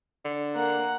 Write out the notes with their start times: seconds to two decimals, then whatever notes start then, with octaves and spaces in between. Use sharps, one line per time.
0.25 D3
0.55 A#3 F#5